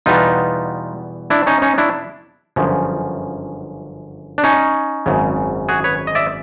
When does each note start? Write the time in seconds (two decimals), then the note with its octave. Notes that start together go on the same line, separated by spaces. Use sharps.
0.06 E2 B2 G3 B3 D#4 F4
1.30 D4 E4
1.47 C#4 D#4
1.62 C#4 D#4
1.78 D4 E4
2.56 G1 F#2 C#3 F3
4.38 D4
4.43 C#4 D#4
5.06 G#1 F#2 C#3
5.69 F#4 G#4
5.84 B4 C#5
6.07 D#5
6.15 D5 E5